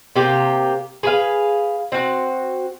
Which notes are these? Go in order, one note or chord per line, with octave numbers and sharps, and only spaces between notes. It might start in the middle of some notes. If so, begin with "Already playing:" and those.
C3 A#3 G4
G#4 B4 F5
C4 F#4